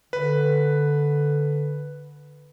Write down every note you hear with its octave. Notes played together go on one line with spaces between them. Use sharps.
D3 B4